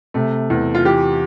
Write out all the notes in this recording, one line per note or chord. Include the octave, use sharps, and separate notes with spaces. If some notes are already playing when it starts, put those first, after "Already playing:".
C3 A3
E2
F4
E3 G4